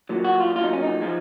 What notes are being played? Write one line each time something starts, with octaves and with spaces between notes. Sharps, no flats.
A#2 F#3
F#4
F4
A#2 F#3 F4
D#4
C#4
D#4
F3 G#3